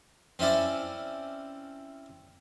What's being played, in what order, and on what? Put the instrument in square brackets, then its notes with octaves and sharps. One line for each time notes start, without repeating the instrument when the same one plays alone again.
[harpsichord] C4 C#4 E4 D5